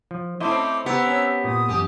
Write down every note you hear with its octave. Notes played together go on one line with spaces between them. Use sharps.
F3
A3 C4 C#4 E4 C5 D#5 D6
B3 G4 A#5 E6 F#6
C#4
A#2 D#6
F#2 E3 G4